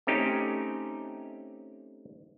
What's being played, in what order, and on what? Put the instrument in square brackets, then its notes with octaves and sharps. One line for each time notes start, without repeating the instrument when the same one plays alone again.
[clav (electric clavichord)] A3 C4 C#4 D#4 G4